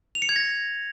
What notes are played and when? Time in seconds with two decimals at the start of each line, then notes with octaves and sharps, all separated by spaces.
0.15 F7
0.22 C#7
0.29 G#6
0.36 A#6